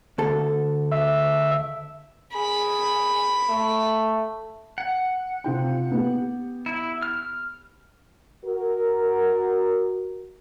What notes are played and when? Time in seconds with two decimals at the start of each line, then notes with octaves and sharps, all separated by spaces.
0.18 D2 A4
0.92 E5
2.35 G#4 B5
3.49 A3
4.78 F#5
5.44 C3 F4 G5
5.91 B3 G4
6.66 E4
7.02 F6
8.45 F#4 A#4